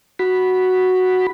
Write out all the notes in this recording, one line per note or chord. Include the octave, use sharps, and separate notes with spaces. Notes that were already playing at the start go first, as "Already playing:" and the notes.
F#4 B5